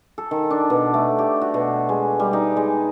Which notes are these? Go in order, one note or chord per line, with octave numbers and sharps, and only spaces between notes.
A4
D#3
D4
B2
A3
G4
F#4
B2
G#3
G3
D#4
G#3